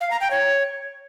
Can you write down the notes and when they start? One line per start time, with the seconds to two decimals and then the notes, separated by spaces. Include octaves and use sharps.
0.01 F5
0.11 A#5
0.21 G5
0.31 C#5